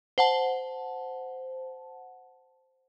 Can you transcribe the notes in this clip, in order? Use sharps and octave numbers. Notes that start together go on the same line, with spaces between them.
C5 F#5 A5